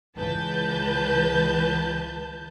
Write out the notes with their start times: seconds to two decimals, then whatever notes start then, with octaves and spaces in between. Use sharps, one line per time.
0.16 C#2 E3 B4 A5 G6